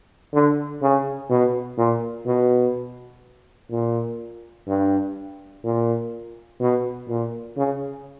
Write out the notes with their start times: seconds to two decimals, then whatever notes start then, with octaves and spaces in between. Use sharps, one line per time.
0.33 D3
0.82 C#3
1.30 B2
1.78 A#2
2.26 B2
3.71 A#2
4.68 G2
5.64 A#2
6.60 B2
7.09 A#2
7.57 C#3